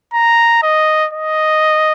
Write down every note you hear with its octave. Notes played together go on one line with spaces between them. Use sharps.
A#5
D#5
D#5